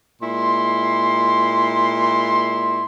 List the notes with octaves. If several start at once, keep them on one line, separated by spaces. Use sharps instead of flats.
A#2 G#3 E4 C6